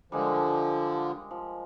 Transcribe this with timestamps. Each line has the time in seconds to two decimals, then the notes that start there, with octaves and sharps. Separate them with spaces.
0.12 D3 F3 G3 G#3 A#4
1.31 F3